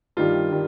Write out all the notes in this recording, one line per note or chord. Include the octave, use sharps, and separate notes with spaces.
G2 D#3 G3 F4
D#3 G3